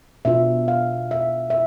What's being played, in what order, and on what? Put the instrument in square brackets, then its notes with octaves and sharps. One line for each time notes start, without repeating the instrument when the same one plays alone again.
[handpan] B2 B3 D4 F4 E5
F5
E5
E5